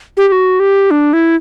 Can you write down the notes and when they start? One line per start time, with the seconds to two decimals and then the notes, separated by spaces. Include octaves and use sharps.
0.17 G4
0.28 G4
0.32 F#4
0.60 G4
0.91 D4
1.13 E4